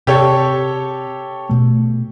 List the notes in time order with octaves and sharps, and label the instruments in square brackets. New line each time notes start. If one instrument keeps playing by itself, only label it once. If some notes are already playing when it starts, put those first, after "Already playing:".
[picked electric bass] C3 [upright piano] G4 A4 C#5
[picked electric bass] B2 A3